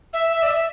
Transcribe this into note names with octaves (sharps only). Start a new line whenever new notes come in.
E5
E5
D5
E5